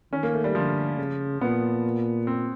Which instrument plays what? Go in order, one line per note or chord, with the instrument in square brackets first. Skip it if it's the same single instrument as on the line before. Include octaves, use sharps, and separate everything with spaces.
[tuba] D#3 [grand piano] C#4
[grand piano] A#3
A3
G3
[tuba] D3 [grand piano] F3
[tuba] C#3
[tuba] A#2 [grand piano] B3
[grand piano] C4